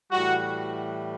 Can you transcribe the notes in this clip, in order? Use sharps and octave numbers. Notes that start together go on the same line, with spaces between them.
A2 E3 G3 F#4